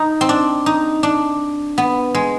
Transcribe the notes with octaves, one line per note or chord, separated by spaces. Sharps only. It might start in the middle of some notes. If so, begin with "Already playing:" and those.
Already playing: D#4
C4
D4
D#4
D4
B3
G#3